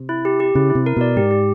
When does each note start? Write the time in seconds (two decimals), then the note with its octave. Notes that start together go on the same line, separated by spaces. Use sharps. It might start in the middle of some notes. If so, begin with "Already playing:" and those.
Already playing: C3
0.09 E4
0.25 G4
0.40 G4
0.55 C#3 E4
0.70 E4
0.75 C3
0.86 A#4
0.96 B2 D5
1.16 G#2 G4
1.31 G4